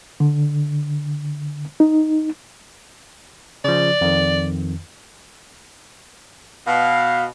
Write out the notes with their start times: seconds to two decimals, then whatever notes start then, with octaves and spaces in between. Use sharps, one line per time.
0.20 D3
1.80 D#4
3.64 C#3 F3 D5
4.01 F2 D#3
6.67 B2 F5